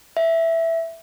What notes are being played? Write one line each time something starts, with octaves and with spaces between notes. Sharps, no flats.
E5